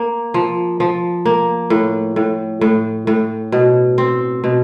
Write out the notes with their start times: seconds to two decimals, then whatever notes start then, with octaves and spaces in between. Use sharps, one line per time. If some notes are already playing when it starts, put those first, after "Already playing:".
Already playing: A#3
0.34 F3
0.80 F3
1.25 A#3
1.70 A2
2.16 A2
2.61 A2
3.07 A2
3.52 B2
3.98 C4
4.44 B2